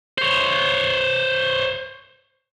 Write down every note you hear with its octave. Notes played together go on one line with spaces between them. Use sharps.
C5 C#5